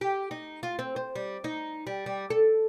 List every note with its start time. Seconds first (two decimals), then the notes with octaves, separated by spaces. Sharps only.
0.01 G4
0.31 D#4
0.63 F4
0.79 C4
0.96 C5
1.16 G3
1.44 D#4
1.87 G3
2.06 G3
2.30 A4